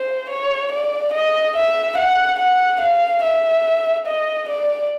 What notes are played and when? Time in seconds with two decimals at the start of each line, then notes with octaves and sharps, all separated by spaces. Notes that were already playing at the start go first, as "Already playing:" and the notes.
Already playing: C5
0.30 C#5
0.72 D5
1.13 D#5
1.56 E5
1.97 F#5
2.39 F#5
2.81 F5
3.23 E5
4.07 D#5
4.49 D5